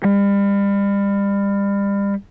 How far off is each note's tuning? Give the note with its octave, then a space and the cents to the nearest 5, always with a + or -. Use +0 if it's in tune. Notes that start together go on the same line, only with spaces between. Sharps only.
G3 +35